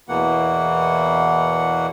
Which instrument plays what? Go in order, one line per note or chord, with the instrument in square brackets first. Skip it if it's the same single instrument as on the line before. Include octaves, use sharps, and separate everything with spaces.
[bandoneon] E2 B2 E3 A#3 F#5